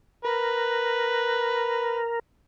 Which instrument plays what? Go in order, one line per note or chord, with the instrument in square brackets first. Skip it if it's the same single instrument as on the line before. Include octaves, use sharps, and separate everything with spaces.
[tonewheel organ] A#4 [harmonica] B4